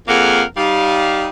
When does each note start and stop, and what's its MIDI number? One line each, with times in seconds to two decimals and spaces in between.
0.08 0.43 41
0.08 0.43 58
0.08 0.43 68
0.08 0.43 70
0.08 0.43 77
0.08 0.43 78
0.57 1.29 55
0.57 1.29 63
0.57 1.29 77